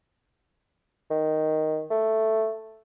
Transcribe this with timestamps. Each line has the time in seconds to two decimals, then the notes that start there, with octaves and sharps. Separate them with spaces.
1.10 D#3
1.90 A3